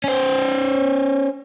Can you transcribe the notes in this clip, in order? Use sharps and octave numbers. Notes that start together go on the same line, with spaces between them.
C#4 C5